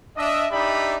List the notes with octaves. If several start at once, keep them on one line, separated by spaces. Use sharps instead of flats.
D4 D#5 E5
D4 D#4 G4 D5 E5 B5